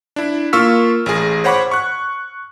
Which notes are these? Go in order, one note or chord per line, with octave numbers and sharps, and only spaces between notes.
D4 E4
A#3 F4 C#6 E6 F6 B6
A1 G#4
C5 C#5 F#5 B5 C#6 D6
C#6 F#6